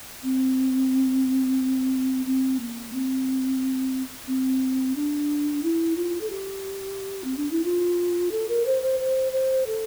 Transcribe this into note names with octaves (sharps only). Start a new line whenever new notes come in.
C4
C4
A#3
C4
C4
D4
E4
F4
A4
G4
C4
D4
E4
F4
A4
A#4
C5
C5
C5
C5
A4